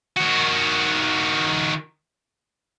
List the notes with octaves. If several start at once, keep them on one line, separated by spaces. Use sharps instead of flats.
D#3 F#4